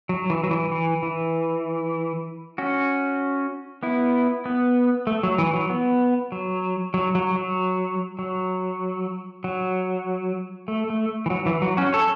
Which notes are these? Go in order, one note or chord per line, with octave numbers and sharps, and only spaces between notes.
F#3
E3
F#3
E3
E3
E3
C#4 F#4
B3 E4
B3
A3
F#3
E3
F#3
B3
F#3
F#3
F#3
F#3
F#3
F#3
A3
A3
E3
F#3
E3
F#3
C#4 F#4
A4 C#5